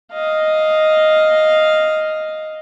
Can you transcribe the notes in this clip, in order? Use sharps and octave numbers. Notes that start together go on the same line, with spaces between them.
D#5 F5